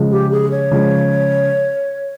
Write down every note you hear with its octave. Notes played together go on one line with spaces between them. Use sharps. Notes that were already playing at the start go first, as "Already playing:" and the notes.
Already playing: C#3 F3 G#3
G4
G#4
C#5
C#3 F3 G#3